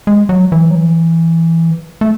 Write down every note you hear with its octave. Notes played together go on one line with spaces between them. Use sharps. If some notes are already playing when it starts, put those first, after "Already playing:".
G#3
F#3
E3
F#3
E3
A3